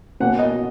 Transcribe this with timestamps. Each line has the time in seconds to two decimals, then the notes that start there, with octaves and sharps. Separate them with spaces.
0.20 B2 A#3 C#4 F#5
0.39 D#5